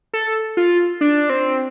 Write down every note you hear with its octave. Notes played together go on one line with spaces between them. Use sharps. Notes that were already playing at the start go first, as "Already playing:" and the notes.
A4
F4
D4
C4